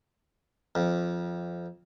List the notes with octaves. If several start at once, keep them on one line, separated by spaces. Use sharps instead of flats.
F2